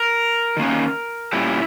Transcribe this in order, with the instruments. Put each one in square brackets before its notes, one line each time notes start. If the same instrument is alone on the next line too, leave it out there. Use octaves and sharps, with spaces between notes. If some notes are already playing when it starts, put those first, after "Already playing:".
Already playing: [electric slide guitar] A#4
D#3 A#3 C#4
A#2 G3 C#4 E4